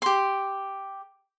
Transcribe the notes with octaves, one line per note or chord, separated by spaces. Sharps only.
G4 C6